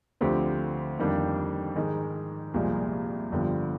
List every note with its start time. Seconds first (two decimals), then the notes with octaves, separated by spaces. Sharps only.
0.21 D2 D3 F3 C4 G4
0.98 F2 D#3 G3 A#3 D4
1.76 G#2 D#3 G#3
2.54 C2 A#2 F3 G#3
3.32 G1 G2 D3 F3